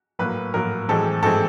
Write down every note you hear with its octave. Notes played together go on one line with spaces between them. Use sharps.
A2 F#3 A#3 B4
A2 F#3 A#3 A#4
A2 E3 G#3 C4 A4
A2 E3 G#3 C4 A4